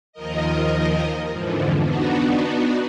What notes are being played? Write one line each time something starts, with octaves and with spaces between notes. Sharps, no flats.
D#2 D#3 F3 A#4 D#5
F2 G#2 D3 E3 F3
B3 D4 D#4 F#4